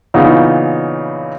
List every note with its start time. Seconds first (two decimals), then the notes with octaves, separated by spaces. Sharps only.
0.14 A#2 C#3 E3 B3 D#4